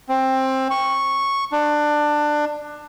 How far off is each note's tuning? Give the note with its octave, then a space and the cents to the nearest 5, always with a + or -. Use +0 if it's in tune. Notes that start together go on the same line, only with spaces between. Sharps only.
C4 +15
C#6 -5
D4 +20